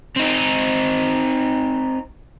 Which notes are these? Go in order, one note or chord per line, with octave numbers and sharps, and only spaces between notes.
C4 D#4